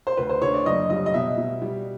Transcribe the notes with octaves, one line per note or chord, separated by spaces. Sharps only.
C5
D2 B4
C5
D3 C#5
D5
F#1 D#5
G3 D#5
D#5
B2 E5
B2
G3